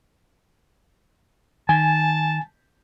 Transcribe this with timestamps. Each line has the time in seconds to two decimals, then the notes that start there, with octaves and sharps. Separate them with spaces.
1.69 D#3 G#5 A5